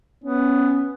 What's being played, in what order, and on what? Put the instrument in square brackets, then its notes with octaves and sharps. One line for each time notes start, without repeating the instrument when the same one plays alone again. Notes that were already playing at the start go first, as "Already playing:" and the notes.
[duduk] B3 [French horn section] C#4